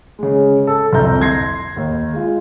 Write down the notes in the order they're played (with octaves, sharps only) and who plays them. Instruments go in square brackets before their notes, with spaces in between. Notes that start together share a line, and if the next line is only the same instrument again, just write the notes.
[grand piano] C#3 G#3
A4
G1 C2 F2 E5 A#5 G6
C6 G#6 A#6 C7
D#2
G#3 F4